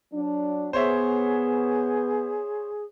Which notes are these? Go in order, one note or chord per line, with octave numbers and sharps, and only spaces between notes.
F#3 D4
B3 G#4 C5 C#5 E5